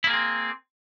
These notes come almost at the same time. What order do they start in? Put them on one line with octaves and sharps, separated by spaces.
E4 A#3 G#4 C4